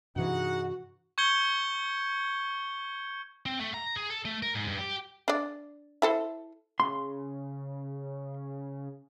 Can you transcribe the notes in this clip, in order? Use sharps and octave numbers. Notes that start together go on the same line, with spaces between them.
G2 C3 E3 D#4 F#4 G#4 F#5
C#6 G6 G#6 C#7 G7
C4
A3
A#5
G#4
A4
A3
A#4
G#2
G2
G4
D4 D5
E4 A4 C5
C#3 C6